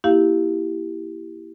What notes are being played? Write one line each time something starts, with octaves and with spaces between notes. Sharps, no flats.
A#3 E4 G4 F5